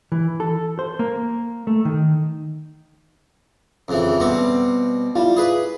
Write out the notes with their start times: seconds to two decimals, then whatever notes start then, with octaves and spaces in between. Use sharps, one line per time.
0.12 E3
0.40 A4
0.79 C5
0.99 A#3
1.67 A3
1.85 D#3
3.88 F2 C#3 E3
4.20 B2 G3 C4
5.15 G3 E4 F4
5.37 G#4 B4